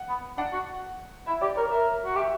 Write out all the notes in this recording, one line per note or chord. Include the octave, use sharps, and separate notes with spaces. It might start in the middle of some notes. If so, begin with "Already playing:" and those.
Already playing: F#5
B3
D4 F#5
F#4
E4 E5
G4 D5
A#4 C#5
A#4 E5
F#4
G4 E5